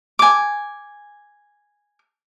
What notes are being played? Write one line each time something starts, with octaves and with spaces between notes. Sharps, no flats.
G#5 D6